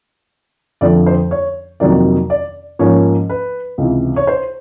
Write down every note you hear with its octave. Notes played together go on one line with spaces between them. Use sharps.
F2 D3 F3 A3 D5
C5
C#5
F2 C3 D#3 F#3 A#3 D5
D5
G#2 F3 A#3 C#4 C#5
B4
C#2 C3 E3
C#5
C5